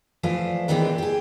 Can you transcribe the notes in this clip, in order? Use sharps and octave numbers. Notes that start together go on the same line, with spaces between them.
E3 F3 A3 D4 A4 C5
A#2 D#3 E3 G#3 C4 D4
G4 G#4